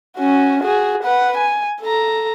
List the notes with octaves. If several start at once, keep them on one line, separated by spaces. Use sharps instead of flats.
C#4 F#4
F#4 G#4
B4 F#5
G#5
A4 A#5